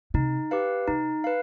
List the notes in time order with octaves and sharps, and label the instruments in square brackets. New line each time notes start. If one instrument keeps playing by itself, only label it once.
[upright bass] C3 [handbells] D#4
[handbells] G4 B4 F5
[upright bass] C3 [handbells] D#4
[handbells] B4 F5